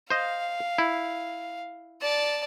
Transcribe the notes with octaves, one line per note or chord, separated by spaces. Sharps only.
C5 D#5 F5
E4
D5 A5